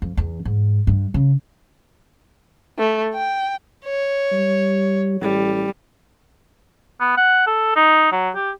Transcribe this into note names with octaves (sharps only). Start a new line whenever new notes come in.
F2
E2
G#2
G2
C#3
A3
G5
C#5
G3
A1 G3
B3
F#5
A4
D#4
F#3
G4